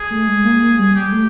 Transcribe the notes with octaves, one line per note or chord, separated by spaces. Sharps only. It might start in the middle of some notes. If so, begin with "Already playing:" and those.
Already playing: G#4
A3
G#3
A#3
A#3
G3
G3 G4
A3